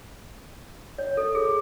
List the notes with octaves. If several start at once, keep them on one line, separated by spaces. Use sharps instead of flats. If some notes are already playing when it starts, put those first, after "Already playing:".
C#5
A4
G#4